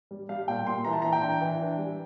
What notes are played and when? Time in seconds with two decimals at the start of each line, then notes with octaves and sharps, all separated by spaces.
0.11 G3
0.29 G3 F5
0.48 A#2 G5
0.67 A#2 C6
0.85 E3 A#5
0.93 A5
1.02 E3 A#5
1.13 G5
1.22 D4
1.41 E3
1.59 D4
1.78 G3